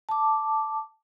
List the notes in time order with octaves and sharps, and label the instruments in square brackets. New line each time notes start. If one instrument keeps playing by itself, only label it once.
[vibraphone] A5 D6